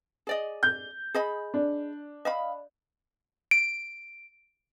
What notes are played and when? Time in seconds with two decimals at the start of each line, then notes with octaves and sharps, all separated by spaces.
0.27 G#4 D5 D#5
0.63 G6
1.14 G#4 D#5 B5
1.54 D4
2.25 D#5 F5 B5
3.51 D7